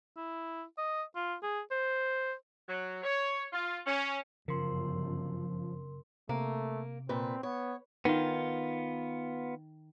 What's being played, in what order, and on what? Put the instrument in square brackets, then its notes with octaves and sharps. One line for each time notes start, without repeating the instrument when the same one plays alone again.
[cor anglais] E4
D#5
F4
G#4
C5
[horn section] F#3
C#5
F4
C#4
[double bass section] G1 F#2 [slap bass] C#3 [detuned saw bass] F3 [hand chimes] A#4 C6
[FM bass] C3 [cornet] A3 [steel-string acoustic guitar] A#3
[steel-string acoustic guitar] A#2 B4 [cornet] C4
[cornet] B3 [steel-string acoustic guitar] C#5
[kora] D#3 [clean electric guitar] B3 F4